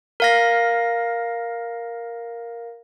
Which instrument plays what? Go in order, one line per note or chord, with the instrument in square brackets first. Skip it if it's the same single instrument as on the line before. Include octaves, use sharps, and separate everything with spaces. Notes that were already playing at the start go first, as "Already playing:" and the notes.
[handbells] A#4 F5 A#6